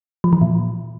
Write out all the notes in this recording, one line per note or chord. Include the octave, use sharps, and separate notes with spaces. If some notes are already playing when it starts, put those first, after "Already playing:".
F3
E3
A#2